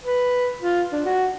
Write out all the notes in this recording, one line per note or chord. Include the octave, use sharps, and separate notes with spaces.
B4
F4
D4
F#4